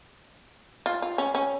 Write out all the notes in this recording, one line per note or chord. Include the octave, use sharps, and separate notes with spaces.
F4
F4
C#4
C#4